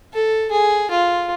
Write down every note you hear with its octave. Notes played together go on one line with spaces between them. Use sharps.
A4
G#4
F4